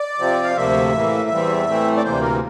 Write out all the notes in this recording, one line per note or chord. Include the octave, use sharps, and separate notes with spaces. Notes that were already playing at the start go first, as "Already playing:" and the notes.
Already playing: D5
C3 F3 C4
F5
D2 C3 F3 A#3 E5
A2 E3 A#3
E2 E3 G3 C4
A2 E3 A3 C4
D5
D2 C3 E3 A#3 C5
A#4